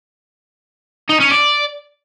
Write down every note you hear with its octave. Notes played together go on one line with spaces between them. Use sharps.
D#4
C#4
D5